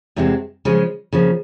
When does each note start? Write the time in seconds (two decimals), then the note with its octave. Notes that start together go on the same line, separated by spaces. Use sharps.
0.16 E2 C3 E3 G#3 C4
0.65 C#3 F3 G#3 C#4
1.12 C#3 F3 A#3